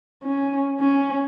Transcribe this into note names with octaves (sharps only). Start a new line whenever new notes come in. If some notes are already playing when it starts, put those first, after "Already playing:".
C#4
C#4